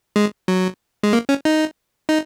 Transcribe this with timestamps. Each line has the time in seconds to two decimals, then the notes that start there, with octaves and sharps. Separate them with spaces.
0.16 G#3
0.48 F#3
1.03 G#3
1.13 A#3
1.29 C#4
1.45 D#4
2.09 D#4